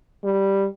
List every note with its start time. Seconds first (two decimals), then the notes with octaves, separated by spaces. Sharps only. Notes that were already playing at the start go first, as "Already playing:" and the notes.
0.24 G3